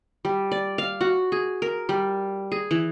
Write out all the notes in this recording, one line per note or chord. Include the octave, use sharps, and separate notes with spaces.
G3
D5
F5
F#4
G#4
A#4
G3
G#4
E3